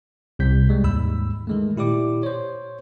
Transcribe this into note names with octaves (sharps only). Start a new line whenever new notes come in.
C2 C3 G6 B6
G3 G#3
D#2 G#2 B5 E6
D#3 G#3 A3
A#2 E4 G4 D5 D6
C5 C#5